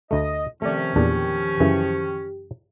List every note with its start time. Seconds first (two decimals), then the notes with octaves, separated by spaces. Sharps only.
0.11 D2 A3 D#5
0.62 C3 D#3 F3 A3 C#4 D5
0.96 E2 A#2 D4 G4
1.60 F#2 C#3 E3